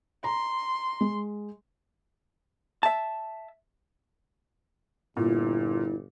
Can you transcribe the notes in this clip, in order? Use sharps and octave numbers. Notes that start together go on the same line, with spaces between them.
A#5 C6
G#3
E5 A5
G1 A#2 E4